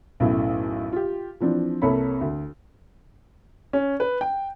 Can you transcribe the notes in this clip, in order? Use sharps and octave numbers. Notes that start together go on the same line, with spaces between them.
B1 F#2 A2
F4 G4
E3 F3 C4 D4
C2 A#3 A4 C#5 B5
D2
C#4
B4
G5